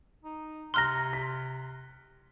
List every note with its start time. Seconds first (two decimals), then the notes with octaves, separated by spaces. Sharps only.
0.24 D#4
0.74 C3 A#5 C6 F6 F#6 A#6
1.13 B6